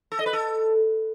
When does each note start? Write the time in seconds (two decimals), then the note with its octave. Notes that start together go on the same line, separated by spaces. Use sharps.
0.12 A4
0.19 D#5
0.26 B4
0.33 A4